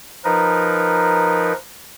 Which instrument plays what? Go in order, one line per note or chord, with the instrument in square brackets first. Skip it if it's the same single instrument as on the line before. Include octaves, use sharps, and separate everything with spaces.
[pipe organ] F3 D#4 A#4 B4